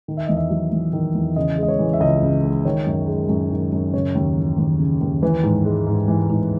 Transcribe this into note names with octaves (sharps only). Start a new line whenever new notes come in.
D#3
E5
E2 D#5
E5
F#3
E2
D#3
E2
C#3 D#5
G#3
D#5
C#5
E3
E5
C#2 D#5
C#3
G#3
D#3 C#5
F#2
G#3
F#2
D#3
F#2
C#3 C#5
D#2
E3
D#2
C#3
D#2
E3 B4
G#2
G#3
G#2
E3
G#2